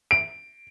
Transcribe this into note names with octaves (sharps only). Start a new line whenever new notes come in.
D7